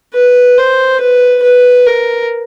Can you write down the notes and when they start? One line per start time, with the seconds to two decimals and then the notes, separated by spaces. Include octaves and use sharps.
0.14 B4
0.58 C5
1.01 B4
1.43 B4
1.87 A#4